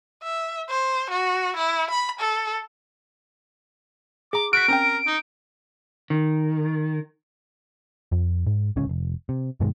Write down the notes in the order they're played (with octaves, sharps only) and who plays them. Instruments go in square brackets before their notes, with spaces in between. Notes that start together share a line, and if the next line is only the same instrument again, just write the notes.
[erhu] E5
C5
F#4
E4
B5
A4
[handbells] G#4 A#5 [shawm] D6
[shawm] F#4 [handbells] F6 B6 [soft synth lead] D7
[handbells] C4 C#4 G5 [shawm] A#4
[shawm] D#4
[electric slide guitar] D#3
[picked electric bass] F2
G#2
D1 C#2 C#4
F1
C3
G2 B2 D#3 G#3